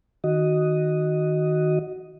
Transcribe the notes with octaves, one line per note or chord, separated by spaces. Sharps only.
D#3 F#4 D#5